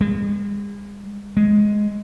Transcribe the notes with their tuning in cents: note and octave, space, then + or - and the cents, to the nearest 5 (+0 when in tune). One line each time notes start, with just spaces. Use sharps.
G#3 -40
G#3 +5